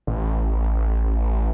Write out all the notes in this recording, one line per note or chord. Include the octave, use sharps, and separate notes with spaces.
A1